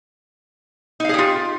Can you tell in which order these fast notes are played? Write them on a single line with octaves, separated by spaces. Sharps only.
D#4 F5 G#4 G4 F4